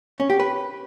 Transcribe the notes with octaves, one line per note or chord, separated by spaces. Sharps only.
C#4
G4
B4